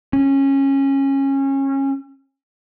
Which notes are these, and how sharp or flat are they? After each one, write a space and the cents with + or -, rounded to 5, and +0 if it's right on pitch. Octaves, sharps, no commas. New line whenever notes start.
C#4 -20